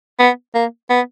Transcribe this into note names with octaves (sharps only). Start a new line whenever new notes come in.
B3
A#3
B3